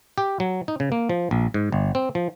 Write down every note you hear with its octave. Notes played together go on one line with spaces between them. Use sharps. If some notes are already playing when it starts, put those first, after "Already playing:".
G4
F#3
D#4
C#3
A#3
F3
A#1
G#2
G1
C4
F3